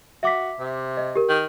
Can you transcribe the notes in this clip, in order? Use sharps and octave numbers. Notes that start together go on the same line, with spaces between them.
F#4 E5 D6 B6
C3
D#5
G4 A#4
D#3